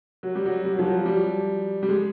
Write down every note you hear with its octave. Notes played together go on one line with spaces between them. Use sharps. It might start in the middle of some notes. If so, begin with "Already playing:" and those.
F#3
G3
F#3
G3
F#3
F3
F#3
G3
G3
G#3